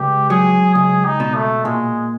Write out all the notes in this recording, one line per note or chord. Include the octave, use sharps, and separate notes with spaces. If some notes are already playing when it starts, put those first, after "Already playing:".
Already playing: C#2 G4
F#3 G#4
C#2 G#4
D#4
B2
A3
A#2 G#3